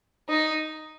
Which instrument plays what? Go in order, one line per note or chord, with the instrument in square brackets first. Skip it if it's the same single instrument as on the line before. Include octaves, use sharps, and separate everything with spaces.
[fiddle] D#4